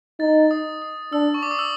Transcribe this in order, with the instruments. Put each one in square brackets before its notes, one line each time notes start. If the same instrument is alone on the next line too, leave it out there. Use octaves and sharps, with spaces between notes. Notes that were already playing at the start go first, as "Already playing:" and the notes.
[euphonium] D#4 [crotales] A6
[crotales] D#6
D#6
[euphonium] D4 [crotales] E6
[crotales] C#6
D6
D#6
E6